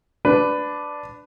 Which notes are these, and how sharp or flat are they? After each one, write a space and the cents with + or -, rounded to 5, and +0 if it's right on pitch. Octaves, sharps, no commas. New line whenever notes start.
D4 +0 B4 +15